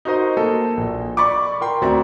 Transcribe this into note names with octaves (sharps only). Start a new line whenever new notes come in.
D#4 F#4 A#4 C5 D#5
A#3 A4 D#5
A#1
D5 B5 C#6 D6
A#4 G5 C6
D2 C4 F#4 D5 E5 A#5